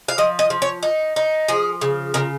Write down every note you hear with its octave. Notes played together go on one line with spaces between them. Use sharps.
F5
F3 D#5
D#5
F3
C#5
D#4
D#4
F3 G#4
C#3
C#3 A#4